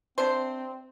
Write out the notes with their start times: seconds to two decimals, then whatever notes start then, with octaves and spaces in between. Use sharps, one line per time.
0.18 C3 C4 D4 C5